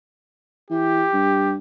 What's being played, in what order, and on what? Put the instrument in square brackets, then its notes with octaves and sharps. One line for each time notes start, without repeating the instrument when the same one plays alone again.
[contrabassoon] E3 [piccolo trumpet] G4
[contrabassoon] G2